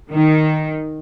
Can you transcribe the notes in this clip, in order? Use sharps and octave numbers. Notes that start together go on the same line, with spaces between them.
D#3